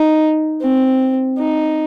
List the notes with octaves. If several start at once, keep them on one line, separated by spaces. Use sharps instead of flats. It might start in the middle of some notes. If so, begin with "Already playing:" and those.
Already playing: D#4
C4
D#4